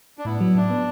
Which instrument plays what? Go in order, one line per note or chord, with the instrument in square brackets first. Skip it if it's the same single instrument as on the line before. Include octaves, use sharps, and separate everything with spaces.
[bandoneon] D4
[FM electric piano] A2 [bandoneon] B3 E4
[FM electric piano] F#3
[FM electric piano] A2 [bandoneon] D4
[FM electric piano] B3